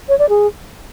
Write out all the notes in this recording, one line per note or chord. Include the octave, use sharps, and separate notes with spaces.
C#5
D5
G#4